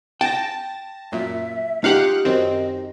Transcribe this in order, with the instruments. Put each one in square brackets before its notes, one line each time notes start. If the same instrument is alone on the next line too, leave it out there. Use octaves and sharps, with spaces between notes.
[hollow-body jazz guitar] G5 [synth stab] A5 A#6
[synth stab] F#2 A#2 [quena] E5
[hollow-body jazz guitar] D#4 G4 [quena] F4 [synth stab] F5 F#5 F#6
[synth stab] F#2 D#3 C4 [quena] D#5